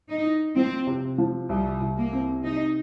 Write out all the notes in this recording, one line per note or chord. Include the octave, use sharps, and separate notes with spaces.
D#4
D#4
F3 C4
C3
F3
C2 G3
C2
A#3
C4
C3 D#4